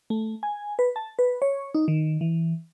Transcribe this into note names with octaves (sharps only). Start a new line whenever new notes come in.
A3
G#5
B4
A5
B4
C#5
D#4
D#3
E3